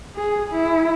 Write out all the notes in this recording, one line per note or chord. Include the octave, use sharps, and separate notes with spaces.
G#4
E4